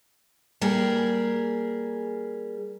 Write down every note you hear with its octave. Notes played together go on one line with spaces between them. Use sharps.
G3 A#3 G#4 A#4